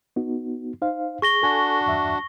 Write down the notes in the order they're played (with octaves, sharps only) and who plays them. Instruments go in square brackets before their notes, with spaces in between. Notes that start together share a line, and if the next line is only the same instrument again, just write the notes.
[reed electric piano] B3 D#4 F#4
D#4 C5 F5
[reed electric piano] G#4 [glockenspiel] C#6 A#6 G7
[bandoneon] D4 F#4 [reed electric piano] A4 G#5
[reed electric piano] E2 G2 E5